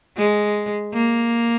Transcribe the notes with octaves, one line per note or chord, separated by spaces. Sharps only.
G#3
A#3